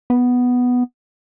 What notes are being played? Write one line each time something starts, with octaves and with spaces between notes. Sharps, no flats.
B3